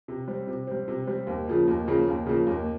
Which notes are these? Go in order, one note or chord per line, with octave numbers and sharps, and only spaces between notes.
C3
G3 C4
C3
G3 C4
C3
G3 C4
D#2
C#3 F3 A#3
D#2
C#3 F3 A#3
D#2
C#3 F3 A#3
D#2